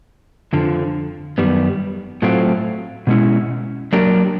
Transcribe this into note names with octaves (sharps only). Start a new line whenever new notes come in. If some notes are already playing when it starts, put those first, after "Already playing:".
F2 D3 F3
F#2 D#3 G3 B3
A2 F#3 A3 C4 F4
B2 G#3 C#4 E4
F#3 A#3 D4 G4 A#4